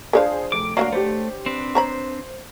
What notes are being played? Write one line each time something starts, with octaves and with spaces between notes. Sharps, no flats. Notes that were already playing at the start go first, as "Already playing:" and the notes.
F3 D4 G#4 C5 F5
F1 D6 D7
D3 E3 F#3 A#3 F#4 F5
A3 G4 C5
C4 D4 B4
C5 C#5 A#5 B5